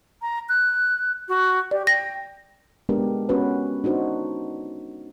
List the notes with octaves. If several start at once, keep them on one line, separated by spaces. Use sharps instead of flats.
A#5
F#6
F#4
G4 D5
G5 A#6
G#3 B3 D4 G4 A#4
B3 C#4 F#4 B4 C#5
D4 D#4 F#4 C5